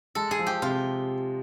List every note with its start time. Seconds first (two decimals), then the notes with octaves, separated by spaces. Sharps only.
0.15 G#3 A4
0.31 G#4
0.39 F3
0.46 G4
0.62 C3 F4